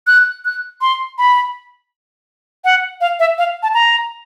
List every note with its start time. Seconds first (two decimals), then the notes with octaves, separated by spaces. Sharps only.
0.07 F#6
0.45 F#6
0.81 C6
1.18 B5
2.64 F#5
3.01 F5
3.19 E5
3.38 F5
3.63 A5
3.74 A#5